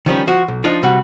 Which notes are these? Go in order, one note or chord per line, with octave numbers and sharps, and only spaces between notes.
D#3 F3 G3 C#4
F3 F#4
B1
F3 D4 D#4 F4
C3 G3 F#4 F#5